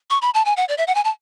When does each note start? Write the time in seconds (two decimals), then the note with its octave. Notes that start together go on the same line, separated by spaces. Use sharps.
0.10 C#6
0.22 B5
0.34 A5
0.45 G#5
0.57 F#5
0.68 D5
0.78 E5
0.87 F#5
0.95 G#5
1.04 A5